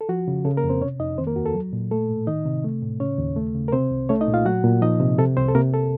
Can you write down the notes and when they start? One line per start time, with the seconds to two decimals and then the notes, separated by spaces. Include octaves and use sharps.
0.01 A4
0.09 F3 F#4
0.28 C#3
0.45 C#3 A4
0.57 A#3 A#4
0.64 F2
0.69 C4 C5
0.81 C3 C#4 C#5
0.99 F2 D#4 D#5
1.18 D#3 C4 C5
1.27 A#3 A#4
1.36 D#2 F#4
1.46 A4
1.55 F#3
1.73 A#2
1.91 A3 A4
2.10 A2
2.27 D#3 D#4 D#5
2.45 C3
2.64 A3
2.82 A2
3.00 C#3 C#4 C#5
3.19 D#2
3.36 A3
3.55 C#3
3.68 A#4
3.72 C3 C4 C5
3.91 C2
4.09 A3 C#4 C#5
4.21 D#4 D#5
4.28 A#2
4.34 F4 F5
4.45 F#3 F#4 F#5
4.64 A#2
4.82 F3 D#4 D#5
5.00 C3
5.18 C3 A4
5.37 C2 C4 C5
5.48 A4
5.55 C3 A#3 A#4
5.74 A4